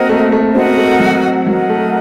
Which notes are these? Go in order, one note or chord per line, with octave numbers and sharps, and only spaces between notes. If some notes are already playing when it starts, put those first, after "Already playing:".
Already playing: A#3 C4 F#4 A#4 D#5 F#5
A3
A3
C4 F#4 A#4 D#5 F#5
A3
F#3
F#3 F#4 A#4 D#5 F#5
A3